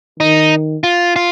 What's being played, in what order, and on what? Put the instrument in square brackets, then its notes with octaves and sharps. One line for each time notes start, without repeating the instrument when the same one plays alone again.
[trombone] D#3 [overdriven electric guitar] D#4
[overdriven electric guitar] F4
F4